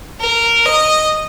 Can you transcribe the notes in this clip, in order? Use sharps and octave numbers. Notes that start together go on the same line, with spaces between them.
A#4
D#5